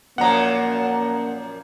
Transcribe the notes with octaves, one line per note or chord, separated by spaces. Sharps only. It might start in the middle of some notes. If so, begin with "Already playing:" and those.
F#2 A#2 F3 A#3 F#5 A#5